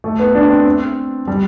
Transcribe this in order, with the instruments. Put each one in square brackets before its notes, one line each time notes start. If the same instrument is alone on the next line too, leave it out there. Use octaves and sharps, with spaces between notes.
[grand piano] A3
B3
D4
C4
G3